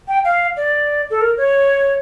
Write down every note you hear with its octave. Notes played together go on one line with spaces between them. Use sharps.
G5
F5
D5
A4
A#4
C#5